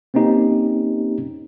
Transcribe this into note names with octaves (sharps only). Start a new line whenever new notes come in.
A#3 C4 C#4 D#4 G4